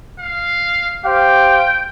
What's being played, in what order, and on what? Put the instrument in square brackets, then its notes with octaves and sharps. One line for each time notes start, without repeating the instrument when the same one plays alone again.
[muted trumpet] F5
[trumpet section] G4 C5 F5 [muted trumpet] G5